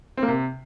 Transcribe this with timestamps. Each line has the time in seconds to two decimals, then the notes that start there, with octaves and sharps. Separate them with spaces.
0.17 C4
0.23 A#3
0.28 C3